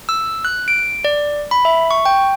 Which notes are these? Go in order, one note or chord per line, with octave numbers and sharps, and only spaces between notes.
E6
F#6
D7
D5
B5
E5
C#6
G5